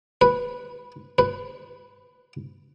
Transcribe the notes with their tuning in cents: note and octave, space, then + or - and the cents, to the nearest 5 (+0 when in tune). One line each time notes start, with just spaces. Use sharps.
B4 -5
B4 +10